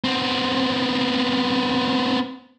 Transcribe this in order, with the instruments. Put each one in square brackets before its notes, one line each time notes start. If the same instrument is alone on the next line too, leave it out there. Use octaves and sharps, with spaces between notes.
[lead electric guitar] B3 C4